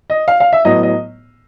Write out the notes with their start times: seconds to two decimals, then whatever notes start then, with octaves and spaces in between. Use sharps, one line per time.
0.10 D#5
0.28 F5
0.40 F5
0.53 E5
0.65 A2 F#3 B3 D#5
0.83 D#5